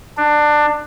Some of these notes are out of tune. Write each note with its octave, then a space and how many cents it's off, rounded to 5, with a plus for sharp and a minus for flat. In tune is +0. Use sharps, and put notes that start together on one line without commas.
D4 +20